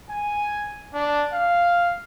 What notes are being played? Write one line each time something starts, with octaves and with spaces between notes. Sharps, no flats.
G#5
D4
F5